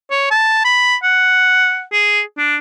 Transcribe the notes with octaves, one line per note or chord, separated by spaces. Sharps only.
C#5
A5
B5
F#5
G#4
D4